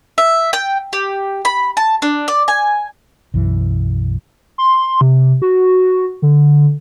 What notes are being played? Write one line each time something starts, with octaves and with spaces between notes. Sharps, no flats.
E5
G5
G4
B5
A5
D4
D5
G#5
B1 F#2 E3
C6
C3
F#4
D3